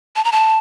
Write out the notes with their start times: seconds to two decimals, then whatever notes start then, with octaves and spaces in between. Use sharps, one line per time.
0.16 A5
0.24 A#5
0.32 A5